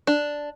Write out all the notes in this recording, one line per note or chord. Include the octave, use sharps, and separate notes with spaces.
D4